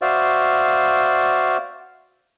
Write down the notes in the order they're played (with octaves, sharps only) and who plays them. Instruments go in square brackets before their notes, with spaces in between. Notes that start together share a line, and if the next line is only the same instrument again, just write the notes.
[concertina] F#4 C5 D5 E5 F5